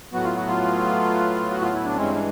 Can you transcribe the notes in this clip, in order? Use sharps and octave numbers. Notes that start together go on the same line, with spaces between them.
A2 F#3 B3 F#4
F4
F#4
F4
F#4
F4
E4
D4
G2 E3 G#3 C4 C#4
C#4